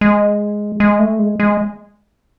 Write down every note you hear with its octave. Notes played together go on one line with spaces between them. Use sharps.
G#3
G#3
A3
G#3
G#3